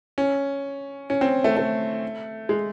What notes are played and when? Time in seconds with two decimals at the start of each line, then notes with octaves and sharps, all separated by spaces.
0.18 C#4
1.10 C#4
1.21 C4
1.44 A3
1.57 A3
2.49 G#3